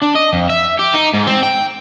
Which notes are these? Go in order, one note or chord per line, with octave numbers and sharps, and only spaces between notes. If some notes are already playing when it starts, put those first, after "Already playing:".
D4
D#5
F2
E5
G4
D#4
G#2
C4
G5